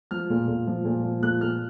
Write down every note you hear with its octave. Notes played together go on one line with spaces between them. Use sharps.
F3 F6
A#2
A#2
F3
A#2
F3
A#2 F#6
A#2 F6